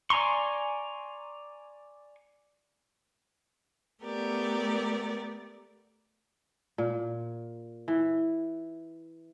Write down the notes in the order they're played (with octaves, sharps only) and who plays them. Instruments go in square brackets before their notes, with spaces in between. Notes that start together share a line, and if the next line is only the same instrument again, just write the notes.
[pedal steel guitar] D5 G#5 A#5 C6 C#6
[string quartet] A3 B3 G4 A#4 D5
[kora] A#2
E3